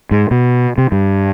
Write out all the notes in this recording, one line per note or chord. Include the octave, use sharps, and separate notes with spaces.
G#2
B2
C3
G2